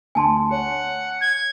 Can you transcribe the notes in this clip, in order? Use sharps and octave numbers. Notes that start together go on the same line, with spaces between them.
D2 G#5 A5 C6
C#5 F#5
G#6